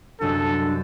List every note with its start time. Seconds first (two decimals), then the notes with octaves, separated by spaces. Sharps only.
0.21 C2 F#2 D4 A4 D#5